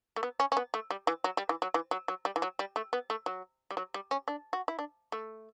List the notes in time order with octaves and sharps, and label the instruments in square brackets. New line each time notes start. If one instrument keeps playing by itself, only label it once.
[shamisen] A3
B3
C#4
C#4
B3
A3
G3
E3
F#3
G3
E3
F#3
E3
F#3
F#3
G3
E3
F#3
G3
A3
B3
A3
F#3
G3
F#3
G3
C#4
D4
F#4
E4
D4
A3